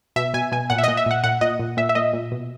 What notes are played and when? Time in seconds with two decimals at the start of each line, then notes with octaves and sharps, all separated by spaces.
0.16 B2 E5
0.34 B2 G#5
0.52 B2 G#5
0.70 A#2 F#5
0.78 E5
0.84 A#2 D#5
0.97 E5
1.06 A#2 F#5
1.24 A#2 F#5
1.41 A#2 D#5
1.59 A#2
1.77 A#2 E5
1.89 E5
1.95 A#2 D#5
2.13 A#2
2.32 B2